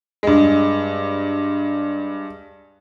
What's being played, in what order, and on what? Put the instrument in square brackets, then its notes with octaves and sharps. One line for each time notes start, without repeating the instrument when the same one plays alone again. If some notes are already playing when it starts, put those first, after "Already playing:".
[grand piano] G2 G#3